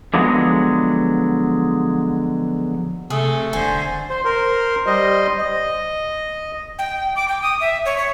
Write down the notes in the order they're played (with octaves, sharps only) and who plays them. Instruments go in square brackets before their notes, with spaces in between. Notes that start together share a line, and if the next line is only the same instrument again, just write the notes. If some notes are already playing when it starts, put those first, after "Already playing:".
[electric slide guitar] D3 F3 F#3 G#3 B3
[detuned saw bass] C3 [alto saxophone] A3 [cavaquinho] G#4
[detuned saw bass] E1 [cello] D3 C5 [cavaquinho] G#5
[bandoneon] C5
A#4 C5
G3 C5 D#5
D#5
[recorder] G5
D6
G5
D#6
E5
C#5
C#5